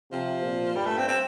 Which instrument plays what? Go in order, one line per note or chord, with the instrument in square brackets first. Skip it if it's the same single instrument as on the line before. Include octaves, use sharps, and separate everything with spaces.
[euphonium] C3 [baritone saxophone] F3
[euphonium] A#2
[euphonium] G2 [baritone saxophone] G3
[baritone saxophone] A3
C4
C4